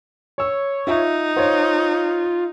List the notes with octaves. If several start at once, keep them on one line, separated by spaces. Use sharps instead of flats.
C#5 C#6 E6
D#4 F4 E5
F4 C5 C#5 C6